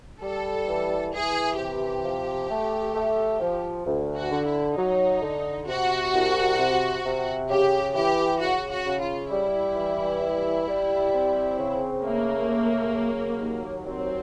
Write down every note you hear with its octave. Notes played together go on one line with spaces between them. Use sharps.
G3 A4
E3
E3 G#4
C3 G4
F3
A3
A3
F3
D2
F#4
D3
E4
F#3 D#4
D3
C3 F#4
C2
C3
C3
C#3 G4
E3 G4
C#3 F#4
F#4
C#3
F4
G3 E4
E3
G3
G3
C4
C#3
A3 A#3
C#3
F#3
D#2
F#3 C4